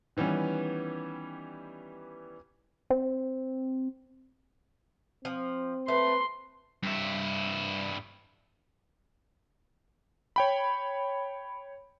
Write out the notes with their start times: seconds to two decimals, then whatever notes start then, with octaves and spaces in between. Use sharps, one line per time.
0.17 D#3 E3 G3 B3 C#4
2.90 C4
5.25 F3 C4
5.88 A3 B4 C6
6.83 G2 E4
10.36 C#5 G5 B5